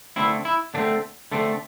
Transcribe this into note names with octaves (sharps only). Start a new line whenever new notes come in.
D3 A3 C4 E4
E4
D3 A3 C4 D4
D3 A3 C4